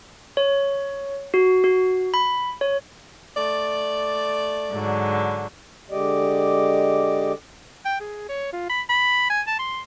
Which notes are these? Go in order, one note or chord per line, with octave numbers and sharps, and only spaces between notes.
C#5
F#4
F#4
B5
C#5
A3 D5
G#2 D3 F#3
D3 G#3 G4 D5 D#5
G5
G#4
C#5
F4
B5
B5
G#5
A5
C6